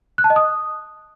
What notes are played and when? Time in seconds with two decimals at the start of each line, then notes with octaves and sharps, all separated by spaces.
0.18 F#6
0.24 A5
0.30 D#5
0.36 D#6